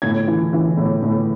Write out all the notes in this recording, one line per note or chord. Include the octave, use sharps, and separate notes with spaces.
A2 G#6
E3
E3
A2
A2